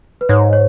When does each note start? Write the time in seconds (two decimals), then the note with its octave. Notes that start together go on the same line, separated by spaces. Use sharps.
0.21 B4
0.29 G#2 C#5
0.53 C#5